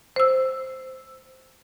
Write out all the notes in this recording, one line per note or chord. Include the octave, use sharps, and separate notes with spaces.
C5 E6